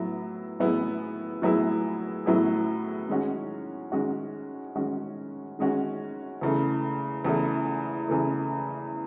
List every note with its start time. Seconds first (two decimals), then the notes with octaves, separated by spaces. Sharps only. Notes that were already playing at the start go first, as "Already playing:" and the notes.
Already playing: A2 F#3 B3 E4
0.60 A2 F#3 B3 E4 G#4
1.42 A2 F#3 B3 E4 G#4
2.26 A2 F#3 B3 E4 G#4
3.09 D#3 G#3 C#4 F#4
3.92 D#3 G#3 C#4 F#4
4.75 D#3 G#3 C#4 F#4
5.59 D#3 G#3 C#4 F#4
6.41 E2 C#3 E3 A3
7.25 E2 C#3 E3 A3
8.08 E2 C#3 E3 A3